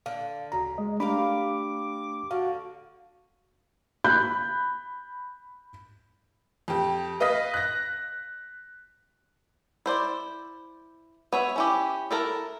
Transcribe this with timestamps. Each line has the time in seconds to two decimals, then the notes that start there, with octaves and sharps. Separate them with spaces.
0.06 D3 F5
0.52 D2 C#3 F#4 A#5
0.78 G#3 D#5
1.00 A3 D4 G4 A#4 F5 B5 D6
2.31 D3 F#4 F5
4.04 B5 F#6 G6
6.68 F2 G4
7.20 B4 D#5 F5 D#6 B6
7.54 F#6 A#6
9.86 E4 C5 D5
11.33 B3 C#5 E5
11.56 C#4 E4 G4
12.11 E4 A4 A#4